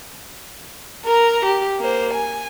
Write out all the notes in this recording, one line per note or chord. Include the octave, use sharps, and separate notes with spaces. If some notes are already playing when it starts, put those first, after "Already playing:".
A#4 A#5
G4
A#3 C5
G#5